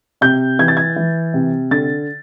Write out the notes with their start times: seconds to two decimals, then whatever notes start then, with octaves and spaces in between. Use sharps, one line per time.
0.21 C3 G6
0.59 E3 G#6
0.68 A6
0.77 G#6
0.96 E3
1.34 C3
1.71 D3 A6